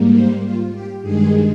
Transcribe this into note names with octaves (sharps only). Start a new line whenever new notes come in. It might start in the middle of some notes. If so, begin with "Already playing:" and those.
Already playing: G#2 G3 A#3
C5
F4
G4
G2 D#3 G#3 G#4